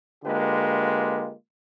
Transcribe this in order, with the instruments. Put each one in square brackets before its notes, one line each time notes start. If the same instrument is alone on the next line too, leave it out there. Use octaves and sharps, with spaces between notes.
[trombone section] D3 G#3 A#3 F4 G4 B4